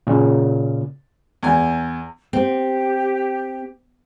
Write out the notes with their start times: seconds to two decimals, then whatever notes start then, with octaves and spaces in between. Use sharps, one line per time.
0.07 A#2 C#3
1.43 E2 G#5
2.33 C4 G4